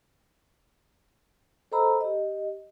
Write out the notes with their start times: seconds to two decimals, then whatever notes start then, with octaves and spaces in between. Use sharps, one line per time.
1.72 A4 C5 D#5 A#5 B5 E6
2.01 G4 D#5